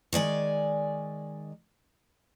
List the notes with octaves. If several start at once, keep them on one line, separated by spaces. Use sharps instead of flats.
D#3 G#3 D5 G#5